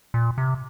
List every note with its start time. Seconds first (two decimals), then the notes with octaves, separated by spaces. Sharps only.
0.14 A#2
0.38 C3